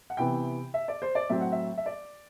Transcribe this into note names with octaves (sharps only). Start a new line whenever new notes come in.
F#5
C3 E3 B3 G5
E5
D5
C5
D5
A2 F#3 C4 E5
F#5
E5
E5
D5